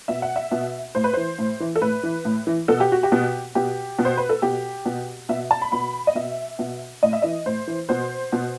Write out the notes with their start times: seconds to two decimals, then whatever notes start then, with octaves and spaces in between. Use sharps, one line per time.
0.08 B2 E5
0.22 F#5
0.36 E5
0.51 B2
0.95 A2 C5
1.04 B4
1.13 E3 C5
1.38 A2
1.60 E3
1.76 A4
1.81 A2 B4
2.03 E3
2.25 A2
2.47 E3
2.68 B2 A4
2.80 G4
2.92 F#4
3.03 G4
3.12 B2
3.55 B2 G4
3.99 B2
4.05 C5
4.17 B4
4.29 A4
4.42 B2 G4
4.86 B2
5.29 B2 E5
5.51 A5
5.61 B5
5.72 B2 B5
6.07 D#5
6.15 B2 E5
6.59 B2
7.03 A2 D#5
7.13 E5
7.22 E3 D#5
7.46 A2 C5
7.67 E3
7.89 B2 C5
8.32 B2